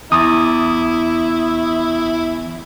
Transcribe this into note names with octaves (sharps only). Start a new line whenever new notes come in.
E2 E4 D#6